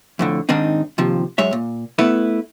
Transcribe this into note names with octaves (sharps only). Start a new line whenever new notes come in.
F2 A2 D3
G#2 D#3 C4 D4 D#4
D#2 C3 F3
F#2 G#3 C#5 E5
A#2
A3 B3 E4 B4